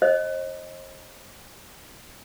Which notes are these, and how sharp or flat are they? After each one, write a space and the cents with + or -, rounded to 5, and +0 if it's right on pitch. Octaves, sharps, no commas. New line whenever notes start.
C5 +35 D#5 +0